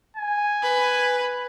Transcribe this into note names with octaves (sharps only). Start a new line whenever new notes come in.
G#5
B4